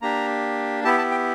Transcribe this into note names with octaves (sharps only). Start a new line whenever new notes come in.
A#3 D4 G4 A#5
B3 E4 G4 A5
A5
G5